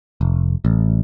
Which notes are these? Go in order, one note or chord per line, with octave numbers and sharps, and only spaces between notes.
F1
A1